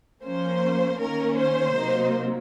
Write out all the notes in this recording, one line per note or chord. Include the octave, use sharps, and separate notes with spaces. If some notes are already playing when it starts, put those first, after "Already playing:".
F3 A#3 C#4 C5
D#3 A#3 C#4 A#4
C5
C3 F#3 A#3 D#4